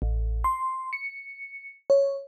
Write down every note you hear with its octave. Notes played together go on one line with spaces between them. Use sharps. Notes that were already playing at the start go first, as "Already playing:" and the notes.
A1
C6
C#7
C#5